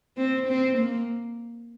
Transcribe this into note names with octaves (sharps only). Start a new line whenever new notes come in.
C4
C4
A#3